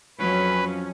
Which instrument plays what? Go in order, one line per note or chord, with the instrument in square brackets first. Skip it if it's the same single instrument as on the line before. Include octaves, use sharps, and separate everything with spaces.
[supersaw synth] F2 C#4 [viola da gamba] F#3 [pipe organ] B4